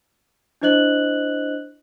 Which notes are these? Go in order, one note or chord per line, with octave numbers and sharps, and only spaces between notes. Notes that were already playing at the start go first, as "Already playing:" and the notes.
D4 E4 C5 D#5 F#6 F#7